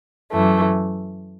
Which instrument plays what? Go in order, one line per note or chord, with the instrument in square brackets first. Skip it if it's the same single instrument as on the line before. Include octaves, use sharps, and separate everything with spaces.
[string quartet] F#2 E3 A3